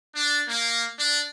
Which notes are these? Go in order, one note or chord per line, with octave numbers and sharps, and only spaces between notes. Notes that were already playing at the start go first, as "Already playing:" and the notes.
D4
A#3
D4